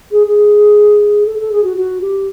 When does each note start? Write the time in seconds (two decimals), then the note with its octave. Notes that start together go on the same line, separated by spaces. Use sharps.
0.11 G#4
0.26 G#4
1.26 A4
1.39 A4
1.52 G#4
1.63 F#4
1.76 F#4
2.01 G4